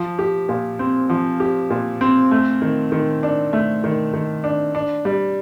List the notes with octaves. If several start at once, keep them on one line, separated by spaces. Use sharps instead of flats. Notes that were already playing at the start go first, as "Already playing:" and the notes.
Already playing: F3
G4
A#2
C4
F3
G4
A#2
C4
A3
D#3
D#3
D4
A3
D#3
D#3
D4
D4
G3